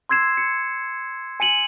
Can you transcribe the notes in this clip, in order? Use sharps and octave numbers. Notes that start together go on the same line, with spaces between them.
C6 E6 G#6 C7 E7
C#7
G#5 C#7 D#7 F#7